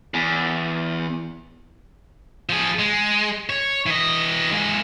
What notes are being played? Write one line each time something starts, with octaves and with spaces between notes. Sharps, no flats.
E2
F3 G#4
G#3
C#5
E3 D#5
G#3 A#3